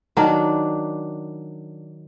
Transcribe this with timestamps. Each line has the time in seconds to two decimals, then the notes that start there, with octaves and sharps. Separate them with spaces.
0.17 D#3 F#3 D4